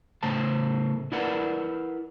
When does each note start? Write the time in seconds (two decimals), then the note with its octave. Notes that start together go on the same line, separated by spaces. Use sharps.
0.23 A2 C#3 A3 C5 A5
1.12 E4 A#4 B4 D5 F#5